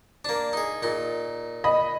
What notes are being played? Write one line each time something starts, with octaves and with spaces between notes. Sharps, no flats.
A#3 D4
D#4 G#4
A#2 D#4
D#5 B5